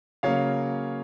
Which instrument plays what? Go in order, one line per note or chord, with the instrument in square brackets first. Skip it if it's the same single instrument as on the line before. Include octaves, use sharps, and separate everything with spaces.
[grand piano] C#3 F#3 A#3 C#4 C#5 F5